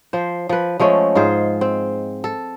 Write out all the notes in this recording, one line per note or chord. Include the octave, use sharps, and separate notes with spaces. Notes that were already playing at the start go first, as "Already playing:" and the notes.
F3 C5
F3 B4
F3 G#3 A3 C#4
G#2 F4 G#4 C5
C4
A4